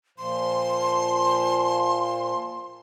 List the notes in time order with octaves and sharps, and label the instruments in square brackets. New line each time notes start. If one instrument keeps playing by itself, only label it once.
[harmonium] A#2 F3 [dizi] C6